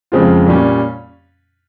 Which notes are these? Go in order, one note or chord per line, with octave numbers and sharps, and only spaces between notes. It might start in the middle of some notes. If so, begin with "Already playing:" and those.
F2 C#3 G#3 C4 F4
A#2 G3 C#4